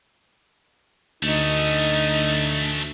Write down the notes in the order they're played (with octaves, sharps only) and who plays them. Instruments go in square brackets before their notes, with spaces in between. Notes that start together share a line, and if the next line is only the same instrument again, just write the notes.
[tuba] D2 [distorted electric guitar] A3 C#4 [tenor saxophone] D#4